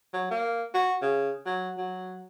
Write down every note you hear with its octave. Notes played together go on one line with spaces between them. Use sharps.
F#3
A#3
F#4
C#3
F#3
F#3